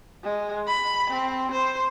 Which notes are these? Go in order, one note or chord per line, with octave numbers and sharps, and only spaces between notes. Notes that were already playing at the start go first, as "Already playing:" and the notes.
G#3
B5
C4
C5